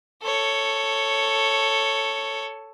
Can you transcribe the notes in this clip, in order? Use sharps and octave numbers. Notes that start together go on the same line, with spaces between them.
A4 C#5